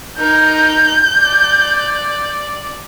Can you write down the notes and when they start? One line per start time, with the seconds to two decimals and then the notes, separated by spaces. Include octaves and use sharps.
0.18 D#4 A#4 G6
1.19 D5